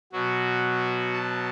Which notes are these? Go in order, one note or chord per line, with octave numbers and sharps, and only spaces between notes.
B2 F#3 F#4
A5